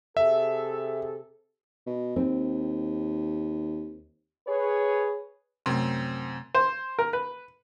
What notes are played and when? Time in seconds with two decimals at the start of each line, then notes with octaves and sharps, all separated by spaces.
0.17 C3 G#4 A4 E5
1.86 B2
2.16 D#2 C4
4.47 G#4 B4 C#5
5.66 F#2 C3 A3 C4
6.55 C5
6.99 A#4
7.13 B4